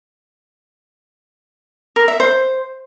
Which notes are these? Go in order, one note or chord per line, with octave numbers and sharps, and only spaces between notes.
A#4
E5
C5